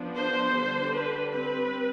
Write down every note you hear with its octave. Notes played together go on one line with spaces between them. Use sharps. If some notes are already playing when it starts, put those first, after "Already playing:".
Already playing: F3 B3 D4
C5
D3 G3 D4
B4
G3 C4 B4